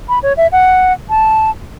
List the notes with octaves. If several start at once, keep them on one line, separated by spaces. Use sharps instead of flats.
B5
C#5
E5
F#5
A5